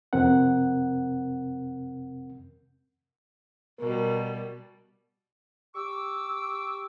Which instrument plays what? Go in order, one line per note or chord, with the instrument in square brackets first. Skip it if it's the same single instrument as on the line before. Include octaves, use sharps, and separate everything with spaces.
[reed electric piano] F2 C3 C4 A#4 F#5
[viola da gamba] B2 G3 [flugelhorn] A#4
[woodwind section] G4 C#6 D6 E6